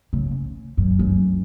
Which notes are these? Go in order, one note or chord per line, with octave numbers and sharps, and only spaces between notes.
C#3
F#2
F#2